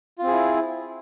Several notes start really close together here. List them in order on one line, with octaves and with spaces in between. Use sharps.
F4 C4 G#4 E4